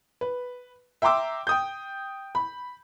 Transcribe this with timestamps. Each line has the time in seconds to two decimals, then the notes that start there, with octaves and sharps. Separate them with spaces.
0.21 B4
1.02 E5 G5 A#5 C6 D6 E6
1.47 G5 D#6 G6
2.35 B5